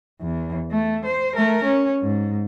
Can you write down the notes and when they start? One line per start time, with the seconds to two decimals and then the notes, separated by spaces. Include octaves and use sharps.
0.22 E2
0.71 A3
1.05 C5
1.35 A3 A#4
1.64 C#4
2.03 G#2